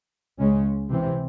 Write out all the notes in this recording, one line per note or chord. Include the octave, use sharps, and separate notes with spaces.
C#2 C#3 G#3 C#4
C3 E3 C4